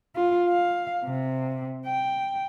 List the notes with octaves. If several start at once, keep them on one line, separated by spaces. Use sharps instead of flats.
F4
F5
C3
G5